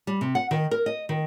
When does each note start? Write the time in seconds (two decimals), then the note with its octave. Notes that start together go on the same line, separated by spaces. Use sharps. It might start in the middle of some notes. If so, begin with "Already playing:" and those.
0.07 G3
0.21 C3
0.35 F#5
0.51 D#3
0.71 A#4
0.86 D#5
1.09 D#3